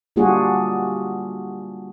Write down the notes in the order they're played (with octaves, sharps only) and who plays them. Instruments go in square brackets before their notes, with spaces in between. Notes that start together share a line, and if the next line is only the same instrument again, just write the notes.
[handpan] G3 A#3 D4 F4 F#4 G#4